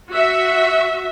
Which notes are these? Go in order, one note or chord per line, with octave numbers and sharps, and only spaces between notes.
F#4 E5